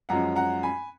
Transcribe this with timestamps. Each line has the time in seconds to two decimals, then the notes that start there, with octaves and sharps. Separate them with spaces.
0.09 F#2 F3 G#3 C#4 F#5 A#5
0.36 F#5 A#5
0.63 G#5 B5